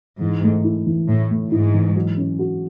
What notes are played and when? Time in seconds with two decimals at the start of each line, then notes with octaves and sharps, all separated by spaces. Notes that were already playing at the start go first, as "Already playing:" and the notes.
0.21 G#2 E3
0.43 A3
0.64 E4
0.87 E3
1.08 A2 E3
1.31 A3
1.51 G#2 E4
1.74 E3
1.96 F#3
2.18 C#4
2.39 F#4